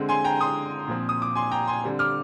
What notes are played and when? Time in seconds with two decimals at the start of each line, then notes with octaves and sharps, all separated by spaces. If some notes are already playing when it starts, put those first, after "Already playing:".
Already playing: D3 G#3 C4
0.09 G#5 C6
0.24 G5 A#5
0.41 C6 D#6
0.88 A#2 F3 C4
1.09 D#6
1.22 D6
1.35 G#5 C6
1.51 G5 A#5
1.67 G#5 C6
1.84 D3 G3 C4
1.99 D6 F6